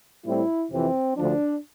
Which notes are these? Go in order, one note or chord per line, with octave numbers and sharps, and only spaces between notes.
A2 G3 C4 E4
F2 C3 E3 C4
D2 D3 F3 D4